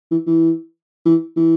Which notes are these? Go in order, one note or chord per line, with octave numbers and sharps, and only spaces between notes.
E3
E3
E3
E3